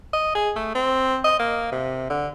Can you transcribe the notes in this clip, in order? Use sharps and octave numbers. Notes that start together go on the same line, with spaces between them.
D#5
G#4
A3
C4
D#5
A#3
C3
D3